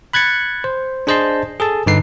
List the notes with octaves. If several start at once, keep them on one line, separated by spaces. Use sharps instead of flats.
B5 F#6 G#6 A6 C#7
C5
D4 G#4 C5 D#5 A5 C6
G#4 A4 A5
G2 D3 D#4 B4 C7